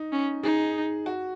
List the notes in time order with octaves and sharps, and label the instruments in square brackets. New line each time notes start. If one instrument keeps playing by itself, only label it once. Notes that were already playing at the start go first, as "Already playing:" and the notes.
Already playing: [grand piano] D#4
[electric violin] C#4
[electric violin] D#4 [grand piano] G#4
[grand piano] F#4